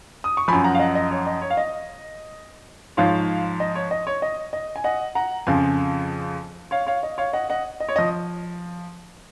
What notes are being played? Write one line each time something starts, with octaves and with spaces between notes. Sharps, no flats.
D#6
C#6
F#2 F3 G#5 B5
F#5 A#5
F5
D#5 F#5
D#5
C#5
D#5
C#5
F5
D#5
G#2 F3 C#5 F5
D#5
C#5
D#5
C#5
D#5
D#5
G#5
D#5 F#5
F#5 A#5
F2 C#3 F3 F5 G#5
C#5 F5
C#5 F5
D#5
C#5 F5
D#5 F#5
D#5 F#5
D#5
C#5
F3 D#5